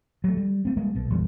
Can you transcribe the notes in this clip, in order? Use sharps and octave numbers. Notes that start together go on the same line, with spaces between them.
F#3 A3
G3
A3 C4
G3 G#3 A#3 B3
B1 B2
A#1 F2 E3 G3